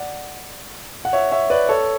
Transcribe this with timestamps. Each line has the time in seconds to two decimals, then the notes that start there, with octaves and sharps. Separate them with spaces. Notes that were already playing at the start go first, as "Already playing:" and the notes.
Already playing: D5 F#5
1.05 F#5
1.13 C#5 E5
1.32 C#5 E5
1.50 B4 D5
1.69 A4 C#5